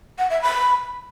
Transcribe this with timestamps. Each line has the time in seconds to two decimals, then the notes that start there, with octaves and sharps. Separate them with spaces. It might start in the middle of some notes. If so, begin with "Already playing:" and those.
0.18 F#5
0.30 E5
0.42 B5